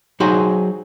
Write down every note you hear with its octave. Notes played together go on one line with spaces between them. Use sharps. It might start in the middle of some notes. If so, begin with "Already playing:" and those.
F#3 D#4 F#4 G#4 C5